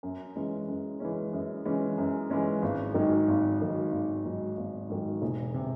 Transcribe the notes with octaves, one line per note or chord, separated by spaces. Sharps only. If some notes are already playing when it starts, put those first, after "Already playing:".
F#2
E3 G#3 C#4
F#2
E3 G#3 C#4
F#2
E3 G#3 C#4
F#2
E3 G#3 C#4
G#1
G#2 D#3 F#3
G#1
G#2 D#3 F#3
G#1
G#2 D#3 F#3
G#1
G#2 D#3 F#3
E1
C3